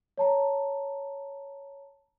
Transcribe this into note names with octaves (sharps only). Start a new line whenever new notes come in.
C#5 A5 A#5